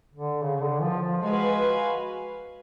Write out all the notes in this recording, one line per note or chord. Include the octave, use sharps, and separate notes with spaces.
D3
C#3
C#3
D3
F3
F3
G#3 F#4 B4 F5 G#5